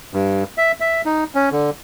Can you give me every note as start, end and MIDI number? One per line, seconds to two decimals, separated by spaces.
0.14 0.44 43
0.58 0.72 76
0.80 1.01 76
1.05 1.24 63
1.35 1.49 61
1.52 1.70 50